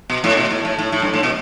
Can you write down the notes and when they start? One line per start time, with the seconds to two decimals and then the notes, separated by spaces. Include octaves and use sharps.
0.10 B2
0.24 A2
0.37 B2
0.50 A2
0.65 A2
0.79 A2
0.92 A2
1.02 G2
1.13 A2
1.23 B2